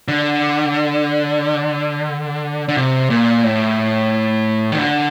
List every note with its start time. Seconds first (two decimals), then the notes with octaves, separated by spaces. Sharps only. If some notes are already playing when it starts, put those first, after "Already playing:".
0.08 D3
2.68 D3
2.77 C3
3.10 A#2
3.44 A2
4.72 D#3
4.78 D3